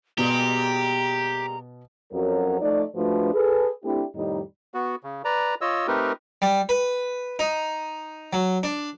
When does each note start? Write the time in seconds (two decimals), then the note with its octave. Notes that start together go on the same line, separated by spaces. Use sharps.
0.18 B2 G3 G#3 A#3 B3 G4 A#5
2.13 F2 F#3 C#4 F#4 A#4
2.61 F3 A3 D#4 D5
2.96 G#2 F3 A3 D4 F#4 B4
3.33 G#4 A4 B4
3.85 A3 C4 D4 E4 G4
4.15 F2 A2 D#3 G3 D#4
4.74 B3 F#4
5.03 C#3
5.25 B4 D5 A#5
5.61 F4 C#5 D#5 E6
5.87 A3 C4 D#4 G4 A#4 B4
6.42 G3
6.69 B4
7.39 D#4
8.33 F#3
8.63 D4